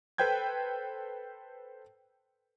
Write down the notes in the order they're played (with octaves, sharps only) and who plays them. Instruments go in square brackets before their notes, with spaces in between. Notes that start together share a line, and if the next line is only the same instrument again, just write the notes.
[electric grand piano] A4 B4 C5 G5 G6 G#6